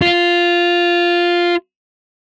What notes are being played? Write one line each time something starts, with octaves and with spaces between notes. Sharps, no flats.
F4